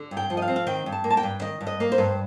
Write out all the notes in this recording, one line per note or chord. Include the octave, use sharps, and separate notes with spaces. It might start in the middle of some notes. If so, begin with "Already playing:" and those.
Already playing: D3
G2
G5
F3
D#5
F5
C4
F5
D#3 G5
G2
A5
A#3
A5
G5
G2
D#3 D#5
G2
D#5
A#3
C5
G2